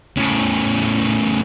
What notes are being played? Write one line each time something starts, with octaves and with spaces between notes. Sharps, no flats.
A2 C#3